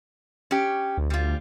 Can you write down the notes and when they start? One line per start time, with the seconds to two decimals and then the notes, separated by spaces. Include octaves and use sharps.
0.51 C#4 G4
0.97 D2
1.10 D2 G3 F4